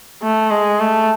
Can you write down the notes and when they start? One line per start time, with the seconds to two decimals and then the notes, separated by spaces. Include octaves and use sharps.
0.22 A3
0.51 G#3
0.80 A3